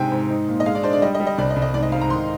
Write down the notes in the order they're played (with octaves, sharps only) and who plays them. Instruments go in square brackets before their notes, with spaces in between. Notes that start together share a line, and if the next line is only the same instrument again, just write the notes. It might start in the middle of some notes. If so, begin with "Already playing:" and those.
Already playing: [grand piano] G#2 C3 [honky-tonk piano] G5 G#5
[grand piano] G#2
D#4
A#2
[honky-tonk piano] D#5
[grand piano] G#3 [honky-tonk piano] F5
[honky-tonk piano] D5
[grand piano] D4 [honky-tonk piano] C5
[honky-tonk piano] D5
[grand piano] G3 [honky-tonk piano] D#5
[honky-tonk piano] D#5
[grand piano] G3
[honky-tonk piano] D#5
[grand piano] C2 [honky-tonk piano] D5
[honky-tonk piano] D#5
[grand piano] C2
[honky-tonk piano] D#5
[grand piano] G#2 [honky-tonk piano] D5
[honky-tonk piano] D#5
[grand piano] G#2 [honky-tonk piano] F5
[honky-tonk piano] A#5
[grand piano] D#3 [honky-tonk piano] C6